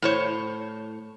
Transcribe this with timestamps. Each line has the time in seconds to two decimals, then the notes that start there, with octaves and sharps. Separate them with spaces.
0.02 A2 C5 C#5